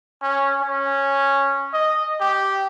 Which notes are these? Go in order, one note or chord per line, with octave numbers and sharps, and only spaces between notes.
C#4
C#4
D#5
G4